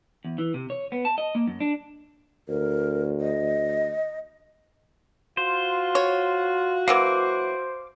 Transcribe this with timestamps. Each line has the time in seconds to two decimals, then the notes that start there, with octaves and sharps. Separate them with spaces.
0.25 E2
0.38 E3
0.54 C3
0.70 C#5
0.92 B3
1.05 A5
1.18 D#5
1.35 A#3
1.48 F#2
1.60 D4
2.49 D2 A#4
3.21 D#5
5.37 F4 F#4 C5
5.95 C#5
6.88 E3 F#3 A#3 C5 F5 D6